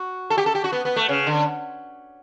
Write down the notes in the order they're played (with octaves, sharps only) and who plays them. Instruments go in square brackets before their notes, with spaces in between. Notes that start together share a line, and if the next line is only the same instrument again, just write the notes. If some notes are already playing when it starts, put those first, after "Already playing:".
Already playing: [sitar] F#4
A4
G4
A4
G4
F#4
B3
B3
A3
C#3
D3